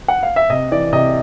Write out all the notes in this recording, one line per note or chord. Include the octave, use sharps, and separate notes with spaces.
F#5
F5
E5
C3 D#5
E3 D5
C3 D#5